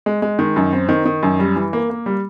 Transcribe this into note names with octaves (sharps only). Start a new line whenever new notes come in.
G#3
G#3
D#3
F#2
C4
D#3
D#3
F#2
G3
E3
A#3
A#3
G3